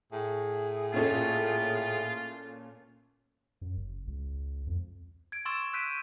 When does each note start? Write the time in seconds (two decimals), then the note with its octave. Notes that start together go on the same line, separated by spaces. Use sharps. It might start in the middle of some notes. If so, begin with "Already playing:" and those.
0.12 A2 G#4
0.94 A#2 C#4 F4 A4
3.62 F#2
3.77 F#1
4.07 C#2
4.67 F2
5.32 G#6 D7
5.45 C6 C#6 E6 A6 E7
5.73 E6 F#6 G6 B6 D7 D#7